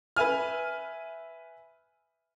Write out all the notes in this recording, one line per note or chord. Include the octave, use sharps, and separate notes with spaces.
B4 E5 G#5 F6